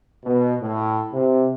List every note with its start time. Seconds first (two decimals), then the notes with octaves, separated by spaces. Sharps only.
0.24 B2
0.61 A2
1.12 C3